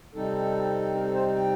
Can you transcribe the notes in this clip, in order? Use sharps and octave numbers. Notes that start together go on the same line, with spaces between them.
C3 G3 C4 D#4 A4
A#4
A4
C5
G5